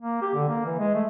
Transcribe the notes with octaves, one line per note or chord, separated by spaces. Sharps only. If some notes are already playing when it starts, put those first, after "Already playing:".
A#3
G4
D3
A#3
E3
G#3
A3